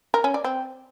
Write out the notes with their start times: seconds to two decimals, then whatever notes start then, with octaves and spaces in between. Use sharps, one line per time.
0.14 A#4
0.24 C#4
0.34 D5
0.44 C4